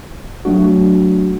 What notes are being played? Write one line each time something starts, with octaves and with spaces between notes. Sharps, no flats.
F#3 A3 D4 F#4